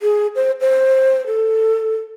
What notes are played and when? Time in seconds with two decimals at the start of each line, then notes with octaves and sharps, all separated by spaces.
0.01 G#4
0.36 C5
0.61 C5
1.27 A4